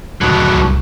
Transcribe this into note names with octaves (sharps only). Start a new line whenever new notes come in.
F#1 D2 A#2 D#3 F#3 D4 F#4 B4
C2